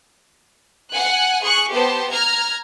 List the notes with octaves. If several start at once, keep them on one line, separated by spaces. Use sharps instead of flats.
F#5 G#5 F#6
G#4 C#6 F#6
B3 G4 C5 A5
A#5 F6 G#6